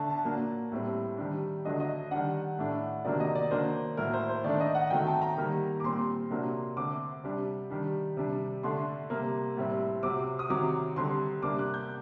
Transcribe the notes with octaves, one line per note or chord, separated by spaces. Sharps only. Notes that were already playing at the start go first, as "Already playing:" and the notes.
Already playing: D3 A3 D4 A5
A5
A#2 F#3 A#3 D4
A2 G3 C4
D#3 G3 D4
D3 F#3 A3 D4 D#5
D#5
D#3 G3 D4 F#5
A2 A3 D4
C3 D#3 F#3 A#3 D4 D5
D#5
D5
D#3 F#3 A#3 D4 C5
A2 F#3 A#3 A#4
C5
C5
D#3 A3 D4 D5
D#5
F#5
D#3 F#3 A3 C4 G5
A5
A#5
D#3 G3 A#3
D6
A#2 G3 C4 C6
C3 F#3 A#3 D4
D3 A3 C4 D6
C3 G3 D4
D#3 G3 D4
C3 G3 D4
D3 A3 D4 C6
C3 G3 A#3
A2 G3 C4
C3 F#3 C4 D6
D#6
C3 D#3 F#3 C4 D6
D3 G3 C4 C6
C3 G3 A#3 D4 D6
F#6
G6